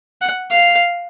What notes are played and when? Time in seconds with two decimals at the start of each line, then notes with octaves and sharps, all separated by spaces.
0.21 F#5
0.51 F5